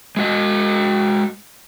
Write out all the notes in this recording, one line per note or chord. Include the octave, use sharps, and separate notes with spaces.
G#3 F#4 D#5